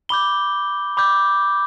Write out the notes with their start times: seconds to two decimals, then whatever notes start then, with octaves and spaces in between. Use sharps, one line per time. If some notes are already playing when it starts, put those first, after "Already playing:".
0.09 B5 D6 G6 G7
0.97 B5 D6 G6